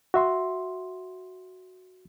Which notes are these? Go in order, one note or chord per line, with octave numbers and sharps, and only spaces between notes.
F#4 E5 C6